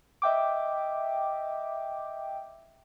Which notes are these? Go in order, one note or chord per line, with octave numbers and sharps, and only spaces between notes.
D#5 E5 G5 D6